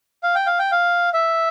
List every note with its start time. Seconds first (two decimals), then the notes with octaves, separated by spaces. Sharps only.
0.23 F5
0.35 G5
0.46 F5
0.59 G5
0.72 F5
1.14 E5